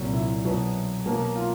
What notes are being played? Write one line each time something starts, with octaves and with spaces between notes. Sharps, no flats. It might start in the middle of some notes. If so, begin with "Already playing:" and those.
Already playing: C2 A#2 F#3
E4
B2 F#3 B3
B2 F#3 A#3
F4